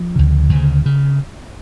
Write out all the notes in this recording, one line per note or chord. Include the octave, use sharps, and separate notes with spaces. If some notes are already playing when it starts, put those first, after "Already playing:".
Already playing: F3
D2 C#3
D2
C#3
C#3